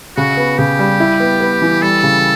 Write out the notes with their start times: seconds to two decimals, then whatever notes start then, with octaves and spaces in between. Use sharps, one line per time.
0.17 C#3 F#4
0.37 B3
0.58 C#3 G4
0.79 G3
1.00 E4
1.20 B3
1.41 B3
1.62 E3
1.82 G3 A4
2.03 C#3